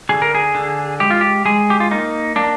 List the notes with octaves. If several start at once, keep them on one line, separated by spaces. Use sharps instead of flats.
D3 G#4
A#4
G#4
D3
G#3 G4
F4
G4
G#3 G#4
G4
F4
A#3 D#4
A#3 D4